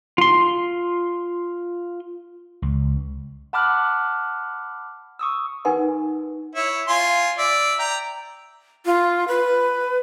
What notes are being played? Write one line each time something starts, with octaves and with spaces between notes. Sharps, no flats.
F4 C6
C#2
F#5 A5 B5 D6 F6 F#6
C#6 D#6 E6
D#4 A#4 B4 F#5 G#5 C6
E4 C#5
F4 G#5 C6
D5 E5
G5 A#5
F4
B4